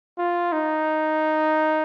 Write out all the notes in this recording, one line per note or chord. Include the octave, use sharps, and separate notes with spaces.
F4
D#4